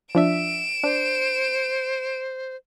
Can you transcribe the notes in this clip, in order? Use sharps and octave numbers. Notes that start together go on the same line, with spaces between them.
F3 D4 E5 D7 E7
D4 C5